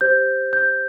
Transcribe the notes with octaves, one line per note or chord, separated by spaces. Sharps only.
G4 C5 G6
G6